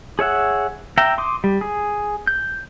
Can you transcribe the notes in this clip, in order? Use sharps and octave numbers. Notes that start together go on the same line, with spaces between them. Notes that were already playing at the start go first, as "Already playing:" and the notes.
G#4 C#5 E5 F#5
E5 G5 A#5
C6 D6 D#6
G3
G#4
G6